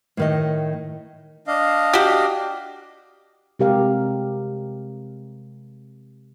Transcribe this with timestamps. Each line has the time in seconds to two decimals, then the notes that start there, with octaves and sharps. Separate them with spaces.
0.17 A2 D#3 D#5
1.47 D4 D#5 F5
1.93 F#4 G4
3.59 C3 G#3 G4 A#4 F5